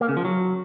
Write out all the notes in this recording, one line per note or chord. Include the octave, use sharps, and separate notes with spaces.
A#3
C#3
F3
F#3